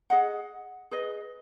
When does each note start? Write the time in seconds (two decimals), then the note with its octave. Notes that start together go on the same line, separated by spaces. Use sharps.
0.10 G#4 D#5 F#5
0.91 G#4 B4 D#5